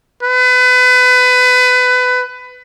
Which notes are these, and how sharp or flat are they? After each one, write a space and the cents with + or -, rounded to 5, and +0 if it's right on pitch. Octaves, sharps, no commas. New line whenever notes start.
B4 +25